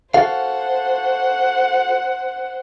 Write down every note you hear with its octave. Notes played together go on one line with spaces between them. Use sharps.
F#4 A4 C5 F5 F#5